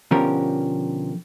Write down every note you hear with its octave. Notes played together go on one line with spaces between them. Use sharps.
B2 D3 F3 C#4 G4 A#4